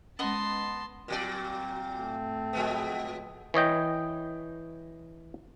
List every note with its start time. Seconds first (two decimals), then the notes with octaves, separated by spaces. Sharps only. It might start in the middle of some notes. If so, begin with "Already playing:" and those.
0.19 G#3 B3 C#4 D#5 A5 C6
1.08 A#2 F#3 C4 D5
1.98 A2 A3
2.53 F3 G#3 B3
3.54 E3 C#5 D#5 G5